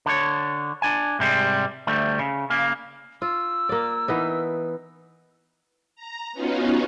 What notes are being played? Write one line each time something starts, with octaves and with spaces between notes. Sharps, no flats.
D3 C#5
D4 G#5
G#2 C3 G3 G#3
D2 G3 A3
C#3
C#3 A#3
F4 E6
A#3 D5
E3 B3 D#4
A#5
B3 C#4 D#4 F4 F#4